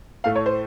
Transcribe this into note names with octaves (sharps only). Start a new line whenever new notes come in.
A2 A3 F5
C#5
C5